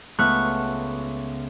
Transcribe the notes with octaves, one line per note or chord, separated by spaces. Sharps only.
C#2 A3 B3 C#6 F6 F#6